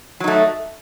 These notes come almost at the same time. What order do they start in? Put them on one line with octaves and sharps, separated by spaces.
F#3 D#4 A3